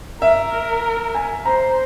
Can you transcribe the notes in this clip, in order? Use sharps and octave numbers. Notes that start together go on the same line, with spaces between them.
A#4 E5
G#5
C5 A#5